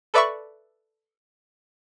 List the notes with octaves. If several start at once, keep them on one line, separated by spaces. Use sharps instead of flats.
A4 B4 D5 E5 B5 C#6